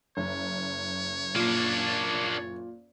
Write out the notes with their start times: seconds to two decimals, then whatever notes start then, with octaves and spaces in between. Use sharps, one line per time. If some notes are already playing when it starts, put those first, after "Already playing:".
0.17 F#1 C#5
1.36 A#2 A#3 D4